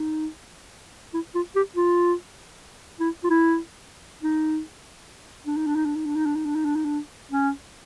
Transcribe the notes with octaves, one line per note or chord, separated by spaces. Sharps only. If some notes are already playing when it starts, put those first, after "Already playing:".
Already playing: D#4
E4
F4
G4
F4
E4
F4
E4
D#4
D4
D#4
D4
D#4
D4
D#4
D4
D#4
D4
D#4
D4
D#4
D4
D#4
D4
C#4